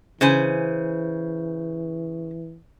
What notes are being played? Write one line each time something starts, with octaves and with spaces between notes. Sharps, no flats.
C#3 E3 C5 G#5